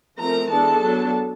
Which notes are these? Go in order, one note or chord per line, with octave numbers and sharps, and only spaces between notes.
F3 A3 C4 A#4 A#5
E3 G#3 B3 D4 A4 A5
F#3 B3 D4